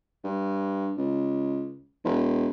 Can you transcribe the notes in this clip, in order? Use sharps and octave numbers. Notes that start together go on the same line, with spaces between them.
G2
C#2
E1